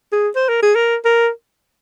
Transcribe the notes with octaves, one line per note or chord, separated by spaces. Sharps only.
G#4
C5
A#4
G#4
A#4
A#4